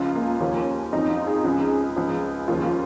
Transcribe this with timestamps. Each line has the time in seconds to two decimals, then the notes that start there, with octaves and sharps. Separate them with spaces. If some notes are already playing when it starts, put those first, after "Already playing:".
Already playing: C#2 C#3 F3 F4
0.15 A#3
0.40 D#2 C#3 F3 C#4
0.93 F2 F3 D#4
1.10 F4
1.27 G#4
1.44 C#2 C#3 F3
1.96 C#2 C#3 F3
2.48 D#2 C#3 F3 F4